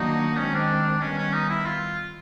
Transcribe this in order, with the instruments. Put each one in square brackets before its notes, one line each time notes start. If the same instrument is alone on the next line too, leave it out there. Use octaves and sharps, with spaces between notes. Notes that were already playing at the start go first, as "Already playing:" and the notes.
Already playing: [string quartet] D#3 F#3 A#3 D4 F#4 [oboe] D#4
[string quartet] D#3 G#3 C4 [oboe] C#4
[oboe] D4
[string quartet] D#3 G3 B3 [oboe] C#4
[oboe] C#4
D#4
E4
F4